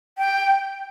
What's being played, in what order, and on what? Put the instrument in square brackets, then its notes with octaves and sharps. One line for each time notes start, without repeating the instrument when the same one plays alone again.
[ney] G5